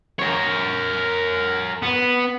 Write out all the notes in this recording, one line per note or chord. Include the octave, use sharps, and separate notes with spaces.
A#4 C#5
B3